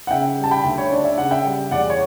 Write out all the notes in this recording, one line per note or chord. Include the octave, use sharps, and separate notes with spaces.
F#5
C#3 E5 G5
G3
A5
G5 B5
D2
C#5
D4 D5
E5
C#3 F#5
E5 G5
G3
E2 D5 F#5
C#5